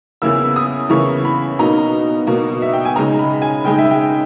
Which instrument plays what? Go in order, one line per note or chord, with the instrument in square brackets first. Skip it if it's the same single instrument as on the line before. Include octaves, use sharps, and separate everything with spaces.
[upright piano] E2 C#3 E3 A#3 E4 E6
D#6
E2 C#3 E3 A#3 E4 C#6
B5
B2 A#3 D#4 A#5
B2 A#3 D#4
E5
G5
G#5
C#3 G#3 D#4 A#5
B5
G#5
C#3 G#3 D#4 G5
E5
G5